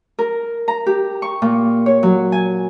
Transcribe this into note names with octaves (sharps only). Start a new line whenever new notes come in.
A#4
A#5
G4
C#6
A#2
C#5
F#3
G#5